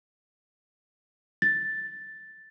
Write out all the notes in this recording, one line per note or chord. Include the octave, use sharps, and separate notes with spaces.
A6